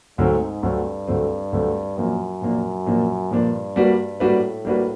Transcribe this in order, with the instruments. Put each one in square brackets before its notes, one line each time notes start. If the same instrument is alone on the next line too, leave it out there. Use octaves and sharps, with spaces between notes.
[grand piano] D2 D3 F#3 A3 C4 [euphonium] G#2
[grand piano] D2 D3 F#3 A3 C4 [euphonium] G2
[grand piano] D2 D3 F#3 A3 C4
D2 D3 F#3 A3 C4
[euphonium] F#2 [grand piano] A#2 F3 A#3 D4
[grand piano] A#2 F3 A#3 D4
A#2 F3 A#3 D4
[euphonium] G2 [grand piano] A#2 F3 A#3 D4
[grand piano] G3 A#3 D4 F#4 B4
[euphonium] A2 [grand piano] G3 A#3 D4 F#4 B4
[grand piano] G3 A#3 D4 F#4 B4